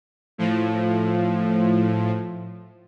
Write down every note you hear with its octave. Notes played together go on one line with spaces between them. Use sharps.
A2 F3